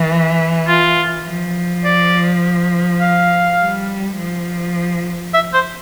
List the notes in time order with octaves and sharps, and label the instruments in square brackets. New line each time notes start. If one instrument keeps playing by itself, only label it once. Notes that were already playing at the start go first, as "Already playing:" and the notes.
Already playing: [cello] E3
[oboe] F4
[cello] F3
[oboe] D5
F5
[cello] G3
F3
[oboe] E5
C5